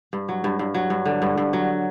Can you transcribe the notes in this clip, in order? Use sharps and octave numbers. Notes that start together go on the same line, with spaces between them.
G2
F#3
G2
G2
F#3
G2
D3
G2
G2
F#3